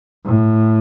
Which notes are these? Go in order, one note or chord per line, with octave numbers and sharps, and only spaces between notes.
A2